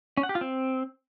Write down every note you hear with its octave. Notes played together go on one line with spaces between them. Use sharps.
C#4
F#5
G4
F4
C4